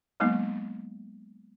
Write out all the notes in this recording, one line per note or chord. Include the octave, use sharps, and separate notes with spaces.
F#3 G#3 A#3 B3 D#4